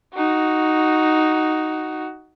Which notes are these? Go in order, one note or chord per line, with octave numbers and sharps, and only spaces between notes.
D#4 F#4